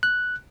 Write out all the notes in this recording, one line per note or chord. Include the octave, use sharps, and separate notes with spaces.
F#6